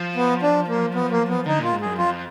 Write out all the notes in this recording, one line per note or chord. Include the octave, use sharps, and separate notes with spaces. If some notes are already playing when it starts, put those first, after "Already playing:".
Already playing: F3
B3
D4
A#3
B3
A#3
B3
D3 D#4
A#2 F4
G#2
F#2 G#4
F2 F4